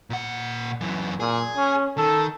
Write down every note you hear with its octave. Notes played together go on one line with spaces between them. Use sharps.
A#2 F#5
F#2 E3
A#2 G#4
C#4
D#3 A4